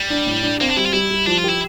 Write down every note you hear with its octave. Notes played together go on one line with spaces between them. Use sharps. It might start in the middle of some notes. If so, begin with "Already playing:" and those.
Already playing: G3
D4
A2
D4
A#3 C4
D4
G3 E4
F4
G3 E4
G3
F3 D4
F4
G4
E4